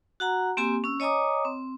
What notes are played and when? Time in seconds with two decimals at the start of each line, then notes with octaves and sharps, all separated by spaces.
0.20 F#4 F#5 A#5
0.57 A#3 C4 G4 G#5 C6
0.84 C#4 E6
1.00 C#5 D#5 G#5 A#5 D6 D#6
1.45 C4